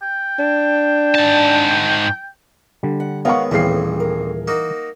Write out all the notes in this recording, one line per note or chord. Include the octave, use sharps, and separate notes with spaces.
G5
D4
G#2 A5
D3 G3
F#5
D#3 G#3 B3 C#5 F5 F#5 C#6
D#1 A1 F2 E3 G3 G#4 F5 C7
A#4
A#3 D#4 F#4